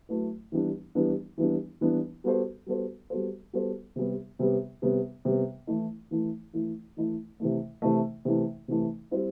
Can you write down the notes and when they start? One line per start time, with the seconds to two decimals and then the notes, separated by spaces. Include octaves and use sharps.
0.09 F#3 A3 E4 B4
0.52 E3 G3 B3 D4
0.95 E3 G3 B3 D4
1.38 E3 G3 B3 D4
1.81 E3 G3 B3 D4
2.24 G3 B3 F#4 A4 C5
2.66 G3 B3 F#4 A4 C5
3.10 G3 B3 F#4 A4 C5
3.53 G3 B3 F#4 A4 C5
3.96 C3 G3 B3
4.39 C3 G3 B3
4.82 C3 G3 B3
5.25 C3 G3 B3
5.67 E3 A3 E4
6.11 E3 A3 E4
6.53 E3 A3 E4
6.97 E3 A3 E4
7.40 C3 E3 A3
7.82 C3 E3 A3
8.25 C3 E3 A3
8.68 C3 E3 A3
9.11 G3 C4 E4